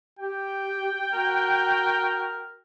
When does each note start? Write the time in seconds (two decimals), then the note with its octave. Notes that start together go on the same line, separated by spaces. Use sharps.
0.19 G4 G5
1.14 F#4 A#4